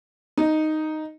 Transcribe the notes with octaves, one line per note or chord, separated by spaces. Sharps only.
D#4